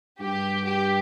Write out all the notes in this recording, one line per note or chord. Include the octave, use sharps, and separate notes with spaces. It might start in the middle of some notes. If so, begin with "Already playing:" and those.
G2 G4
G4